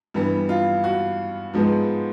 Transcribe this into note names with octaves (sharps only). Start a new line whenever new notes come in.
G2 E3 G3 B3
F4
F#4
G#2 F3 G#3 B3